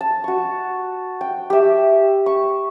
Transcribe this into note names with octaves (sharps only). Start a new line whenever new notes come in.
A5
F#4 C#6
G5
G4 E5
C#6